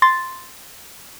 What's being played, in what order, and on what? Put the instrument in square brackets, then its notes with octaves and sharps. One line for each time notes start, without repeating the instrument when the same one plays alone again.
[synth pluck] C6 A6